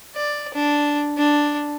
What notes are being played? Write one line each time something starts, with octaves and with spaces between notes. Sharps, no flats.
D5
D4
D4